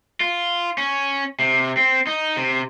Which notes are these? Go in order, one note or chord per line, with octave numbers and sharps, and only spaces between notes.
F4
C#4
C3
C4
D#4
C3